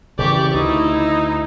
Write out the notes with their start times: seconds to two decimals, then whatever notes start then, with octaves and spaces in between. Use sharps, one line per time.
0.19 C#3 E3 G4 D5 C#6
0.54 D2 D#4 E4